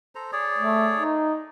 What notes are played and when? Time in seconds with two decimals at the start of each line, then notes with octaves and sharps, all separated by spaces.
0.15 A4 C5 A#5
0.32 G#4 C#5 D5
0.59 A3
0.98 D#4